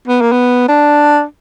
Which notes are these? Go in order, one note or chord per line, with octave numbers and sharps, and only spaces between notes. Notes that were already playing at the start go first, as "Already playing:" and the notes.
B3
A#3
B3
D4